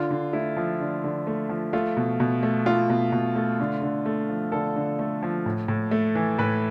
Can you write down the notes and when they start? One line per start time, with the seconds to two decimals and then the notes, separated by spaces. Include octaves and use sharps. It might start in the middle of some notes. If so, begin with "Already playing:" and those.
Already playing: D3 F4
0.11 D3
0.33 A3 E4
0.57 F3
0.80 D3
1.04 D3
1.27 A3
1.49 F3
1.73 A3 F4
1.97 B2
2.20 B2
2.43 A3
2.66 A3 F4
2.90 B2
3.12 B2
3.36 A3
3.60 D3
3.82 D3
4.06 A3
4.29 F3
4.52 D3 A4
4.76 D3
4.99 A3
5.23 F3
5.46 A2
5.68 A2
5.91 A3
6.15 E3
6.38 A2 B4